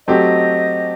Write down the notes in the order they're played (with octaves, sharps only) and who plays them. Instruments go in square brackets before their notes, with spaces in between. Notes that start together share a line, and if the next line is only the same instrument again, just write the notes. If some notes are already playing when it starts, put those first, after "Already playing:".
[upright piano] F#3 A3 C4 G4 [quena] D#5